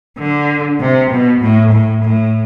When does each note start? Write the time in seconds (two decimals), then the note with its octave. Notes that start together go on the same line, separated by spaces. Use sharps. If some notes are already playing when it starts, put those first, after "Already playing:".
0.18 D3
0.80 C3
1.11 B2
1.41 A2
1.72 A2
2.04 A2